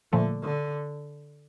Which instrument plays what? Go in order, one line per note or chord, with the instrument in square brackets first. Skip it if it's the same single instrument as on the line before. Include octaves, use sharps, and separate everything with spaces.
[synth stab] A#2 F3 A3 [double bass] D3
[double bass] D3